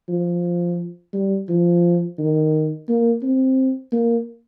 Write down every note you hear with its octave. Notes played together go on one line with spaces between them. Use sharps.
F3
G3
F3
D#3
A#3
C4
A#3